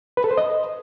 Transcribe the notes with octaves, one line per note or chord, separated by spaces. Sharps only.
B4
A4
C5
D#5